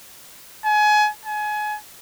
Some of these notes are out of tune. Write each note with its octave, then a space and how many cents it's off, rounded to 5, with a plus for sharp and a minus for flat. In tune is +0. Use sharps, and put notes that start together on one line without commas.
G#5 +25
G#5 +30